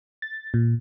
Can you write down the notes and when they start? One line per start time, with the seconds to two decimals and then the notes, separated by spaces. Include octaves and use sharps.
0.22 A6
0.54 A#2